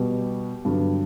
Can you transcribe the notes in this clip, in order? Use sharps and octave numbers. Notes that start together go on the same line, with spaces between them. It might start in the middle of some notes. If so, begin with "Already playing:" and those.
Already playing: B2 G3 B3 G4
G2 D3 F#3 B3